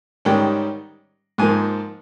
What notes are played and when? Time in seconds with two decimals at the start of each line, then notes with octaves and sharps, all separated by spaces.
0.25 G#2 D#3 G3 C#4 G5
1.38 G#2 F3 A#3 G#5